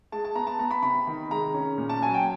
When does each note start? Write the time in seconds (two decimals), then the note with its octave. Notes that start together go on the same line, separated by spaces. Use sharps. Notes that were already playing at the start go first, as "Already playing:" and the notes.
0.12 G#3 A5
0.25 A5
0.35 B3 A#5
0.47 A5
0.59 B3 A#5
0.71 B5
0.82 C3 B5
1.07 D#3
1.31 G#3 A#5
1.54 C#4
1.78 A#2
1.89 A5
2.02 F#3 G#5
2.14 G5